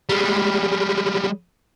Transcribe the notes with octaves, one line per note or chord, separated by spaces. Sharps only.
G3 G#3